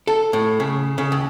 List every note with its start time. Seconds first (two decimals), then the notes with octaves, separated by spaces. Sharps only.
0.07 A4
0.33 A2
0.60 C#3
0.98 C#3
1.12 D#2